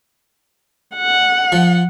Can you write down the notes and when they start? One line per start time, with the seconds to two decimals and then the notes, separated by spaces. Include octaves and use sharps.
0.97 F#5
1.52 F3